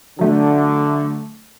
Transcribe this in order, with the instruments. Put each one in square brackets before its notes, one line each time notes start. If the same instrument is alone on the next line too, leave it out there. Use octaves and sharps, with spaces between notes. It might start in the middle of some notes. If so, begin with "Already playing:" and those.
[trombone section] D3 [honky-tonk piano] F#3 A3